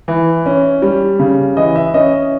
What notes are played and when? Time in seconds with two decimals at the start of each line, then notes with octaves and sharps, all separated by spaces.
0.08 E3
0.46 C#4
0.82 G3
1.19 C#3
1.57 E3 D#5
1.76 E5
1.94 C#4 D#5